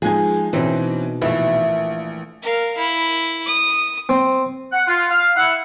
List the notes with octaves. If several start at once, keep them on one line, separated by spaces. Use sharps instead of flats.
F3 G#3 D#4 G#4 G#5
B2 E3 C4 C#4 D#4
A#1 E3 A3
A#4 F5
E4
D#6
C4
F#5
F4
F5
E4 F#5